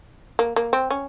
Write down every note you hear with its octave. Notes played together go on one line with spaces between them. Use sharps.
A#3
A#3
C4
C#4